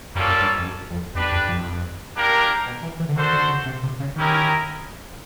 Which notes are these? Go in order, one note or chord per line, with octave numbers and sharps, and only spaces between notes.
F#2 G3 A#3 C#4 F4 A4
F#2
G2
F2
F#2
F2
E2 D4 G4 B4
F2
F2
A#3 D4 G4 A#4
B2
E3
E3
D3
D#3 D4 F#4 A4 C5
D3
C#3
C3
C3
C#3
D#3 C#4 E4 G4 A#4 D#5